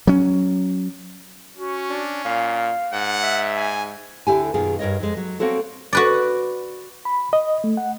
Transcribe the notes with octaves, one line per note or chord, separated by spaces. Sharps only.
F#3 C#4
C#4 F#4
D4
A#2 F5
G#2 F#5
E5
G#5
D2 D3 E4 G4 G#5
F#2 B2 D#3 A#3 F4 G#4
G2 A#4 C#5 D#5
F2 G#3
F#3
A#3 C4 F#4 A4 C#5
F#4 B4 D5
B5
D#5
A3
F#5